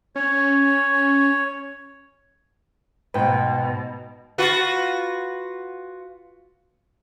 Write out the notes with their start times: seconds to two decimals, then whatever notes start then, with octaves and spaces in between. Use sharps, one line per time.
0.16 C#4 C#5
3.14 G#2 B2 B4 G5
4.38 F4 F#4 B4